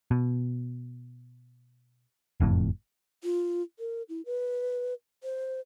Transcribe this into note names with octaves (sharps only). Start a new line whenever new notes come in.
B2
F#1 F2 A2
F4
A#4
E4
B4
C5